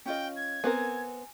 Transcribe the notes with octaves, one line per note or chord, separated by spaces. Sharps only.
C#4 F4 D#5 G5
G#6
B3 C4 A#4 G#5